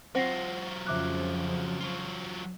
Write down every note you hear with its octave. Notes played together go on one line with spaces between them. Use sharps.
F#3 C4 F4 F#5 A#6 C7
F2 C#3 F3 E5 D6 F#6
F#3 F4